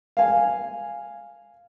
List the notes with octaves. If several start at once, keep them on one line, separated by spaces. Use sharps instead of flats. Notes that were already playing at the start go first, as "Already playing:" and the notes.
F5 G#5